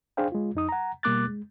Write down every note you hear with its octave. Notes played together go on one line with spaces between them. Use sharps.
D4 G#4 C5 F5 G5
G#3 F4
F2 D#4 D#6
F#5 A#5
B2 G3 A#3 D6 F#6 A6
G#3